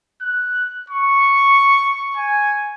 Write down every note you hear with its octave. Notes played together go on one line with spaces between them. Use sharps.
F#6
C#6
G#5